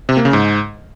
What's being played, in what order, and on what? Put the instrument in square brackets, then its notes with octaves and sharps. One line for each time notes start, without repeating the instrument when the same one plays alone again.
[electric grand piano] C3
A#3
C#3
G#2